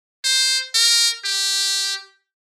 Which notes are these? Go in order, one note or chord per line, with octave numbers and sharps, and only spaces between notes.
C5
A#4
G4